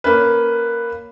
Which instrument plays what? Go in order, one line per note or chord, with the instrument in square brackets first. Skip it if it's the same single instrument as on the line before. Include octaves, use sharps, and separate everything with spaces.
[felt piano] A#3 C#4 B4